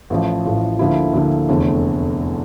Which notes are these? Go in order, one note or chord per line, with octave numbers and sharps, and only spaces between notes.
A1 A2 F3
A1 A2 F3
D2 D3 F3 A#3 E4
D2 D3 F3 A#3 E4
F1 E2 D3 A3